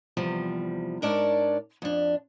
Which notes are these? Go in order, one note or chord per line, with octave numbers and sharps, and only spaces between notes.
E2 C3 F3 G3
G#2 D4 A#4 C#5 D5 A5
F2 D4